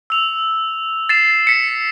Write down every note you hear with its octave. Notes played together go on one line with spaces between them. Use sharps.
E6 F7
A6 C7 E7
B6 C#7